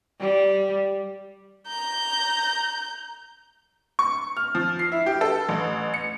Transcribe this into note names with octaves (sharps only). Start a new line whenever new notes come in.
G3
A#5 G6
C#6
F6
F3
C7
E4
G4
A4
A1
C#7